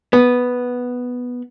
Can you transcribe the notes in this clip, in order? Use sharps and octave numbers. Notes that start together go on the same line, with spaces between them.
B3